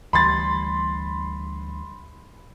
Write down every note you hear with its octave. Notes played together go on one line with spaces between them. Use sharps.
D2 E3 G3 B5 C6 A6